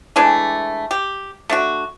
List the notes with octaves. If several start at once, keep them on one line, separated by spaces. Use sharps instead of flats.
E3 G#3 A3 D4
G4
A3 D4 F#4